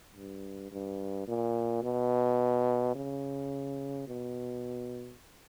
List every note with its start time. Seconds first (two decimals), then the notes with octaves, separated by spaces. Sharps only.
0.15 G2
0.72 G2
1.27 A#2
1.83 B2
2.95 C#3
4.07 B2